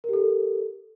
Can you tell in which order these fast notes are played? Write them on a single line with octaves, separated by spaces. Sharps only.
A#4 G4 A4